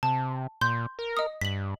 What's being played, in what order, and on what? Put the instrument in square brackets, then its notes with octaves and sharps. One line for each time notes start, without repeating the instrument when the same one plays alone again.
[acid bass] C3 [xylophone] A5
[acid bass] A#2 [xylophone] C6 G6
[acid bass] A#4
[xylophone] D#5 D#6
[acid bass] G2 [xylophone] B6 F#7